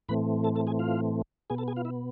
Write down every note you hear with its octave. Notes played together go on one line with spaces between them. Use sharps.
A2 E3 A3 C4 B4 B5
A4 A5
A4 A5
G#4 G#5
F4 F5
B2 B3 G#4 G#5
A4 A5
G#4 G#5
F4 F5
E4 E5